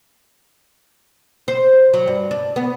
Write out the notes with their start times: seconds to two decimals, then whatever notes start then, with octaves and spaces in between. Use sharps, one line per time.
1.48 C5
1.94 F#3
2.07 G2
2.31 D4
2.56 B3